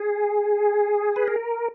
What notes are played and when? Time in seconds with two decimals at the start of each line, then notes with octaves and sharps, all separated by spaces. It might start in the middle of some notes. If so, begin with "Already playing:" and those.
Already playing: G#4
1.16 B4
1.27 A#4